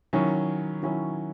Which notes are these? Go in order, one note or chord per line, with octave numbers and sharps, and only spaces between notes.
D#3 F#3 C#4 E4
D#3 F#3 C#4 E4